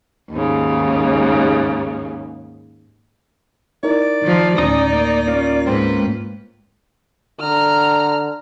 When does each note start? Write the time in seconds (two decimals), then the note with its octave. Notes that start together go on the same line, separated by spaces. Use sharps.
0.31 D#2 G#2 C#3
3.83 D#4 E4 A#4 D5
4.22 D#3 F3
4.58 D2 A2 C#4 D#4 A#5 D#6
4.93 A#3
5.27 A#3 C#4 F4
5.66 G#2 G#3 C4 B4
7.40 D3 A#5 F6